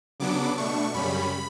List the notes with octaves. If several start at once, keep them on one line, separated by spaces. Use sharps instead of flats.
C#3 F#3 B3 D4 D6
B2 A3 D4 C#6
F#2 C#3 G3 C#4 B5